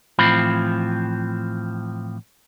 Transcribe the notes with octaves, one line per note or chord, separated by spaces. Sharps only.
A2 E3 F3 C4 F4 B5